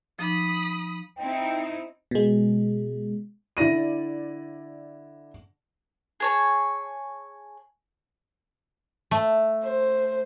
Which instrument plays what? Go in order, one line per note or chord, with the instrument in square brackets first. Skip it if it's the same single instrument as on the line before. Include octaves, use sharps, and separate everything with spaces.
[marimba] F3 D#4 D6 [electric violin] B5 D#6
[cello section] C4 D#4 E4 [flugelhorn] G5
[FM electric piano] B2 G#3
[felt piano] D3 E4 D5 A#6 D#7
[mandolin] G#4 C#5 A5
[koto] A3
[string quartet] C5